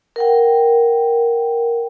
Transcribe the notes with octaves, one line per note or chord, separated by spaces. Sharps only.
A#4 F#5 G5